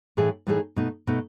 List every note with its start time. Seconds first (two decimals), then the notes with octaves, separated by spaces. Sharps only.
0.17 A2 E3 A3 D#4 G#4
0.47 A2 E3 A3 D#4 G#4
0.76 B2 A3 D#4
1.07 B2 A3 D#4